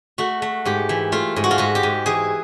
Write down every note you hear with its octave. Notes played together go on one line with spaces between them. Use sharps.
A3 F#4
A3
G#2 G4
E3
A3 F4
G#2
F#4
F4
G#2 F#4
G4
G#2
E3 G#4